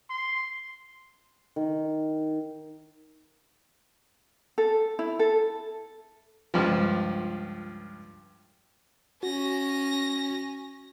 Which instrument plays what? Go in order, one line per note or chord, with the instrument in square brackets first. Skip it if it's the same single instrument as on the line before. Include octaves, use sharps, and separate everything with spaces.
[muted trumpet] C6
[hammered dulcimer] D#3
[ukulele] A4
E4
A4
[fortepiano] C#2 G2 F3
[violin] C#4 A#6 [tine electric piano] F#4